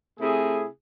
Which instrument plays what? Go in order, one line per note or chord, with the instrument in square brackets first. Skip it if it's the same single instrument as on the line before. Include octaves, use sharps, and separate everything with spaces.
[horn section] C3 A3 E4 G#4